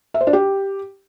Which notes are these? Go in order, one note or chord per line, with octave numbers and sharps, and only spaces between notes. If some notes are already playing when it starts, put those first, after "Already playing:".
E5
C5
D4
G4